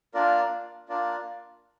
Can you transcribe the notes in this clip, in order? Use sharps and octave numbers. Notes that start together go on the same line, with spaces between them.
A#3 D4 F4 A#4 D5
A#3 D4 F4 A#4 D5